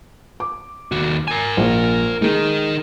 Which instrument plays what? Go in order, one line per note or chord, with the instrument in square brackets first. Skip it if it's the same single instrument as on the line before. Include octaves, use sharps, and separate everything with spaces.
[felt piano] D6
[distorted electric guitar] D#2 F#4
A#4 G#5
[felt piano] A#1
[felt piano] G#3 [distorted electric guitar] D#4 A#4